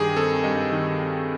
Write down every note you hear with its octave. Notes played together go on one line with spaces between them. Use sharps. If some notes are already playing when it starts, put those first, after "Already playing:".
Already playing: G2 D#3 G4 G#4
C4 A4
G2 D#5
D#3
C4